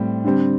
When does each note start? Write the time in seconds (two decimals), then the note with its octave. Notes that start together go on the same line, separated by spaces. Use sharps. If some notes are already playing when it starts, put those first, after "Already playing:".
Already playing: A2 G3 C4
0.24 D3 G3 C4